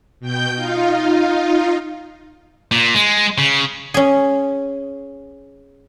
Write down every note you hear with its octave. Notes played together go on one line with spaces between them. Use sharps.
B2 G5 G6
D#4 F4 F5
A#2
G#3
C#3
C#4 G#4